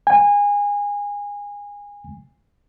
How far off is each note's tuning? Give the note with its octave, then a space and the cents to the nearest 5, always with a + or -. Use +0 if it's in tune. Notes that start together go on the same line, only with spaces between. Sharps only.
G#5 -25